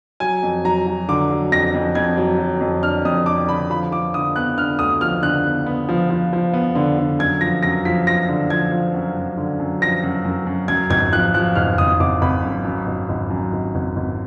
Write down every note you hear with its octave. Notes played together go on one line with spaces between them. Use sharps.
F#3 G#5
F2
F#3 A#5
F#3
D3 D6
F#3
F2 A#6
F2
F2 G#6
F#3
F#3
F2
D4 F6
F2 D#6
D4 D6
D3 B5
F3 B5
F3 D6
D3 D#6
B3 F#6
D3 F6
D2 D#6
F3 F6
D3 F#6
B3
B3
F3
F3
F3
B3
D3
D3
F#2 G#6
F3 A#6
F#2 A#6
F3 B6
F3 A#6
D3
F3 G#6
F3
F#2
F#2
D3
F#2
F3 A#6
F#2
F#2
F#2
F#2 G#6
G#1 G#6
F3 F#6
F3 F#6
G#1 F6
G#1 D#6
G#1 D6
G#1 B5
F#2
F#2
G#1
G#1
F#2
G#1
G#1
G#1